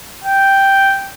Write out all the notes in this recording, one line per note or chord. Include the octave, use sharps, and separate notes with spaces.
G5